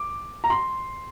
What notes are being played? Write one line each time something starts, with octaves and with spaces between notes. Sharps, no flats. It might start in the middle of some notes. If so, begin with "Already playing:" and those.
Already playing: D6
A#5
C6